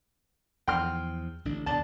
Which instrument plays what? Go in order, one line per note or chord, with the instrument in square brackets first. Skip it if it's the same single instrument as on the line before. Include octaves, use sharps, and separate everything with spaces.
[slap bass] E2 F3 [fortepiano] G5 C6 F6
[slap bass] A1 D3 D4
[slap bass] D#2 B2 [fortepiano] D4 A5